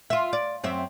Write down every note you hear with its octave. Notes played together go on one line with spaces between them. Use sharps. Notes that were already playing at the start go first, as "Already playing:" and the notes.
F4 E5
D5
F#2 C4 E5